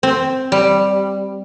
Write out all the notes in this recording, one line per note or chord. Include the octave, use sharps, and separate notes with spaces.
C4
G3